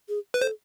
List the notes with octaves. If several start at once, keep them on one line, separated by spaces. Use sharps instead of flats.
G#4
B4
A4 C5